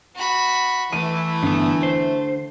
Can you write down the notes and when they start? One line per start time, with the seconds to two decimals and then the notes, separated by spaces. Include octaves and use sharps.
0.16 F#4 B5
0.93 E3 A3 D#7
1.43 G2 D3 B3
1.83 C5